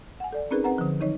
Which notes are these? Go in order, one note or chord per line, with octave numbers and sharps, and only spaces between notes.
F#5 G#5
A4 D5
C4 C#4 D#4 G#4 A#4 B4
C4 B4 F#5 A#5
D3 F3
D#3 F#3 D#4 C#5 D#5